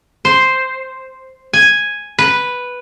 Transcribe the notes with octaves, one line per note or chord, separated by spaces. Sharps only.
C5
G#5
B4